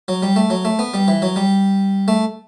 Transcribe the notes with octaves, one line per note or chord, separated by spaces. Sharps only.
F#3
G3
A3
F#3
A3
B3
G3
E3
F#3
G3
A3